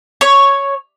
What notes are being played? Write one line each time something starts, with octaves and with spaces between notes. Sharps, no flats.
C#5